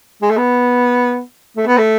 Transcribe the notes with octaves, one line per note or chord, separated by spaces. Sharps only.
G#3
A3
B3
A3
B3
A3